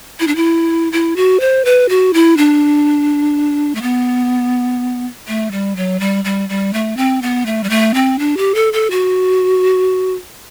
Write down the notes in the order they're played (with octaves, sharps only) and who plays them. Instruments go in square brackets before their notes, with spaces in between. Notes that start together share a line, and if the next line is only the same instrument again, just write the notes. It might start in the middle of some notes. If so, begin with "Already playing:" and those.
[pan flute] E4
D4
E4
E4
F#4
C5
B4
F#4
E4
D4
A3
B3
A3
G3
F#3
G3
G3
G3
A3
C4
B3
A3
G3
A3
C4
D4
G4
A4
A4
F#4